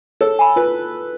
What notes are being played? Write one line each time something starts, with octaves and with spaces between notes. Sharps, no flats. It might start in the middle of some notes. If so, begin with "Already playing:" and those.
A4 C#5
G#5 B5
F4 B4